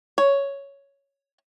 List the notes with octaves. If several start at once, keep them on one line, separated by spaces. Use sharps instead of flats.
C#5